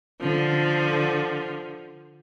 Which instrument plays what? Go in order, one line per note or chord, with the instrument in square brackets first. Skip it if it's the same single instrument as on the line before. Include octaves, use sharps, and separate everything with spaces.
[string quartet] D3 F3